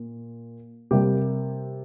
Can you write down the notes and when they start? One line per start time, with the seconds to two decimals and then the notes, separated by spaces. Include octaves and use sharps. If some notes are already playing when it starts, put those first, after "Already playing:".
Already playing: A#2
0.91 C3 G3 A#3 G4